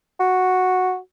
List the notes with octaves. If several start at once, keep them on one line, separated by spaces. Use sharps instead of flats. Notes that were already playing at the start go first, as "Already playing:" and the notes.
F#4